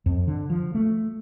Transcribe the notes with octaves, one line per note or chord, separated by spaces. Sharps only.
F2
D3
F3
A3